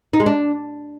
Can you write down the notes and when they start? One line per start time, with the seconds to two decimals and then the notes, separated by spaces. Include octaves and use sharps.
0.13 D#4
0.20 G#3
0.26 D4